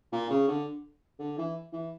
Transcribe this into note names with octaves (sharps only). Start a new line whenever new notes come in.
A#2
C#3
D3
D3
E3
E3